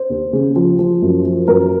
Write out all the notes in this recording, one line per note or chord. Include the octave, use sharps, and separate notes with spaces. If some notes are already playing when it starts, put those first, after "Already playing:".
Already playing: C5
D#2
C#3
F3
F3
F#2
F3
F#2 A#4